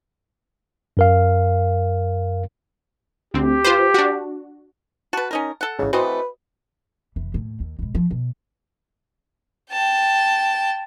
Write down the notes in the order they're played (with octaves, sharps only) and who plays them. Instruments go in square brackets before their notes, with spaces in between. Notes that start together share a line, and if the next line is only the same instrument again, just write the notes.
[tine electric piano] F#2 A#4 F5
[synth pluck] D2 C4 [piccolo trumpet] G4
[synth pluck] F4 B4 C5
D4 F#4
[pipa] F#4 B4 [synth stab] A5
[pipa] C#4 D#4 A#4
A4 F#5
[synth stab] A1 G#2 [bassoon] C#3
[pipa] E3 A3 C4 [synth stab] F#4 C5 D#5 [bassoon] B4
[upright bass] F1 E3
D#2 A2
D#2
G#2 B2
F3
B2
[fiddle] G5 A5